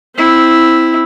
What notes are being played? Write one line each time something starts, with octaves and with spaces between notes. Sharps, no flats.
C4 E4